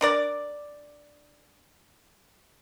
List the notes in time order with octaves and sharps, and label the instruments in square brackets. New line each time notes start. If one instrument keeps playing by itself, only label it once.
[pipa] D4 A#4 D5